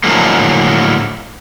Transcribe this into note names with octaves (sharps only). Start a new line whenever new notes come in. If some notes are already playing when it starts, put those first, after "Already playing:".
A2 D3 F3 F#3 G#3 A#3